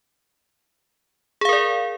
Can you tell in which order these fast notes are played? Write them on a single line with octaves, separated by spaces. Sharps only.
G#4 F5 A#4 D5